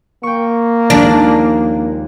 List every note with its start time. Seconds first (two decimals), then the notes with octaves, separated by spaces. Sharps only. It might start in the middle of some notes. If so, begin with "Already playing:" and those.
0.23 A#3 G5 C#6
0.90 D#2 F3 G#3 D4